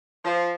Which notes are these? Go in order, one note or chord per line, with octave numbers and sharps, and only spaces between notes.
F3